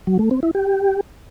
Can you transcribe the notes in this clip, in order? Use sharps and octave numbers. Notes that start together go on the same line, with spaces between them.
F#3
A3
C4
E4
G4